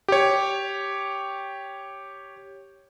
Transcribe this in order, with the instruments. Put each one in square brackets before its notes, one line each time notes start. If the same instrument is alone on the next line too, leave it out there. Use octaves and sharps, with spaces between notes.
[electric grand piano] G4 C#5